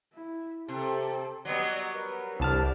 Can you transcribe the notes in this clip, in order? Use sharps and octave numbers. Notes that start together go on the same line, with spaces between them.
E4
C3 G4 A4
F#3 G3 B3 D5 D#5
A#4 B4
C2 D4 G4 A5 F6